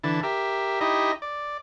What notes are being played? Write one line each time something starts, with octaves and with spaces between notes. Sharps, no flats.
D3 E3 A5
G4 A#4 E5
D#4 E4 G4 D#5
D5